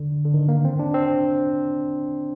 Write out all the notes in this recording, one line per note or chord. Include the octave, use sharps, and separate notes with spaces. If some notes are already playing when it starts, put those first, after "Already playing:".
Already playing: D3
D3
D#3
A#3
C4
D4
C4